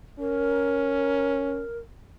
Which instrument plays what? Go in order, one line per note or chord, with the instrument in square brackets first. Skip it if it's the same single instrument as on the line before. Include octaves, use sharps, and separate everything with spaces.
[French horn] C#4 [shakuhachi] A#4